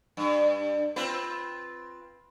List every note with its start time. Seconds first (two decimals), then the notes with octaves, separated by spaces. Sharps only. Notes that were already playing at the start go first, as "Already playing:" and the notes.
0.17 G2
0.96 C4 F4 B4